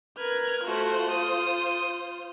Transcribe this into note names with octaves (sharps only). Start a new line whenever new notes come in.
A#4 B4 F6 G#6
A3 F4 F#4 C5
D#6